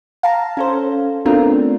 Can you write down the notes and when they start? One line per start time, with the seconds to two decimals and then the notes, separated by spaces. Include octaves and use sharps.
0.23 F5 A5 A#5
0.57 C#4 A4 C5
1.25 A3 B3 C4 D4 F4 A#4